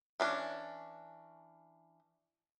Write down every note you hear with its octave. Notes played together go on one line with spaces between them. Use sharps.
E3 C#4 D4